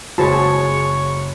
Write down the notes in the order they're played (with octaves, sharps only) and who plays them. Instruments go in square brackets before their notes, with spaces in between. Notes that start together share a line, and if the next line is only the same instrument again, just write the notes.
[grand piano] F#1 G#3 B5 [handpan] F#4 [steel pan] G#4 C5 A5 [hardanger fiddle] C#5